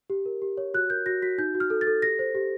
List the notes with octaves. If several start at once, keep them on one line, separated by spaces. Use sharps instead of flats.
G4
A#4
G4
C#5
F#4 F#6
A#4 G6
F#4 A#6
F#4 B6
D#4 G6
F#4
F6
A4
A6
A4
G4 A#6
C5
G4